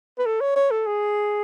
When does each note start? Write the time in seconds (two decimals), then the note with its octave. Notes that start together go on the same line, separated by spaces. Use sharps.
0.18 B4
0.26 A4
0.41 C#5
0.56 C#5
0.71 A4
0.86 G#4